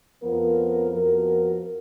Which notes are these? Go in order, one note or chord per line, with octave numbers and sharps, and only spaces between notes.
F2 F3 B3 F4 A#4
F2 F3 B3 F#4 A#4